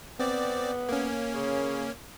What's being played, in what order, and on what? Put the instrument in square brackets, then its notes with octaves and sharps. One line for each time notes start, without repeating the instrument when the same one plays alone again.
[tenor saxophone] B3 [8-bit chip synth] C4 D5
[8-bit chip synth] A#3 C#4
[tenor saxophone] C#3